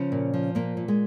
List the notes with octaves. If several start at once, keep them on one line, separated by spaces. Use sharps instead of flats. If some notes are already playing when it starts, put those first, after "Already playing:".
Already playing: C#3 F3 C#4
A#2
F3
A#2 A#3
A#2
G#3